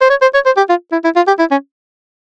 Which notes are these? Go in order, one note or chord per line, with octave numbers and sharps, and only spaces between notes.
C5
C#5
C5
C#5
C5
G4
F4
E4
E4
F4
G4
E4
C#4